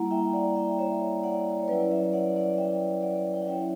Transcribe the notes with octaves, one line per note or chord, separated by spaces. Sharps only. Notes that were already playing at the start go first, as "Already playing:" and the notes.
Already playing: G3 A#3 E4 F#5 A#5
E5 G5
D5 F#5
E5 G5
C#5 E5
D5 F#5
C#5
F#3 C#4 E4 B4 D5
C#5 E5
D5 F#5
D5 F#5
E5 G5
D5 F#5
G5
F#5
F#3 C#4 E4 C#5 E5